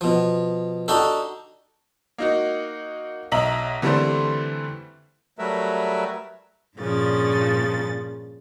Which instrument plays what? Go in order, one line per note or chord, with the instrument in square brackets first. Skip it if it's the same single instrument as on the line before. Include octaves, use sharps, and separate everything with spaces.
[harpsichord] B2 F3
D4 D#4 F#4 G4 A4
[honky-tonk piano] A#3 D#4 F#4
B1 D#5 E5 A#5 B6 F#7
D3 E3 G3 A3 C4 C5
[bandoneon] F#3 G3 A3 A#4 B4 E5
[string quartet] G2 A#2 C#3 F3 A6